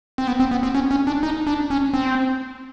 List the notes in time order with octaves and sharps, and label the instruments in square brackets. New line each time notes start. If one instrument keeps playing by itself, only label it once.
[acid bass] C4
B3
C4
B3
C4
C#4
C#4
D4
D#4
D4
C#4
C4